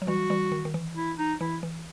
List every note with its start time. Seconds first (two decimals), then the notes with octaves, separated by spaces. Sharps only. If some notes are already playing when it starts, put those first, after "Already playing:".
0.02 F#3
0.07 E3 G3 F#4
0.30 E3 G3
0.52 D#3
0.65 D#3
0.74 E3
0.97 E4
1.19 D#4
1.41 E3 E4
1.63 E3